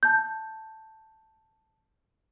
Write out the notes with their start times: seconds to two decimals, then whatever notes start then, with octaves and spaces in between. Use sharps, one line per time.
0.03 A5 G6